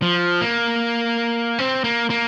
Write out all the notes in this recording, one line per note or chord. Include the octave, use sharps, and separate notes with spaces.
F3
A#3
C4
A#3
A#3